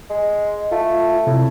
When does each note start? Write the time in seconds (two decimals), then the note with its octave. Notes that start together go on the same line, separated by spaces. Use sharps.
0.10 G#3
0.71 A3 F4
1.27 A2 C3